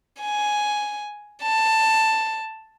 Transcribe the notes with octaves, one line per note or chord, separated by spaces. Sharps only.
G#5
A5